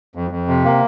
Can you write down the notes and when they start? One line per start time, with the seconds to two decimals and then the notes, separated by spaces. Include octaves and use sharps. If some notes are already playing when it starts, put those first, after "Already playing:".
0.15 F2
0.31 F2
0.48 C3
0.65 A#3